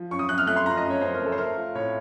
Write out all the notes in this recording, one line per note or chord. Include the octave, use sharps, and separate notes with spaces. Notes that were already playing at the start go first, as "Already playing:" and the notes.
Already playing: F3
F#2 C#6
D#6
F#2 F#6
F6
A3 F#6
C6
F3 A#5
D#5
F#2
C#5
F#2 C5
A#4
A3
A4
C5
A3 A#4
F4
A2 C#5